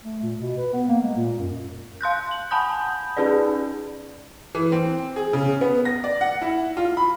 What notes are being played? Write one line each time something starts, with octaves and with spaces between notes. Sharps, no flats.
A3
A#2
B2
B4
B3
A#3
G#3
A#2
F#2
F5 C6 F#6 G6
F#7
F#5 G#5 A5 B5 D#6 G6
C#4 D#4 G#4 B4 D5
E3
C4
G#4
C#3
B3
A#6
D5
F#5
E4
F4
B5